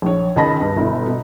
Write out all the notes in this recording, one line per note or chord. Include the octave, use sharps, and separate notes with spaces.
A#1 C#5
C#2 D#3 D#5 A5 B5 A#6
G2
G1 B2 E4
B2